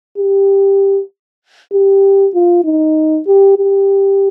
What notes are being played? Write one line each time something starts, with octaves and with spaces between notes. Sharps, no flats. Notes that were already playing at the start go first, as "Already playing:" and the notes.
G4
G4
F4
D#4
G4
G4